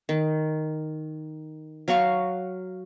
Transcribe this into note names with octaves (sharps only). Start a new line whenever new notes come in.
D#3
F#3 F#4 F5 C#6